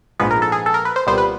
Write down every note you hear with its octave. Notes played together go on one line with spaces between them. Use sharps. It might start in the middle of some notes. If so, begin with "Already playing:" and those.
A#1 G#2 F3 G#3 B3 B4
A#4
A4
G#4
A4
A#4
B4
C5
C2 A#2 G3 B3 C5
B4